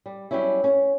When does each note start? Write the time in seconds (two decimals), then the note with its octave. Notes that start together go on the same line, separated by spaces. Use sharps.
0.06 G3
0.31 F#3 G3 B3 C#4 E4
0.64 C#4